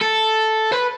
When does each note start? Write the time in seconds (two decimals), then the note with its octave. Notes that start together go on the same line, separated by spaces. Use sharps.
0.02 A4
0.72 B4